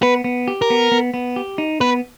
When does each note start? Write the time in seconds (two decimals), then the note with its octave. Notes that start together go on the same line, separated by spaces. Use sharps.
0.03 B3 B4
0.24 B3
0.48 G4
0.62 A#4
0.70 B3
0.92 B3
1.14 B3
1.36 G4
1.58 D#4
1.81 B3 B4